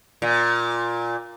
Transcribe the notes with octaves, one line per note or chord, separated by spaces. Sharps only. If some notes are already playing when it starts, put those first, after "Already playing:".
A#2